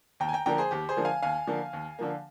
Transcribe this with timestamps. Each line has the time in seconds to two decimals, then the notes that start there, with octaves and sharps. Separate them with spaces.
0.20 D#2 G5 A#5
0.28 G#5
0.33 G5 A#5
0.46 D3 F3 A#3 G5 A#5
0.58 G#4 C5
0.71 D#2 G4
0.89 G#4 C5
0.96 D3 F3 A#3
1.05 F5 G#5
1.22 D#2 F5 G#5
1.47 D3 F3 A#3
1.73 D#2
1.99 D3 F3 A#3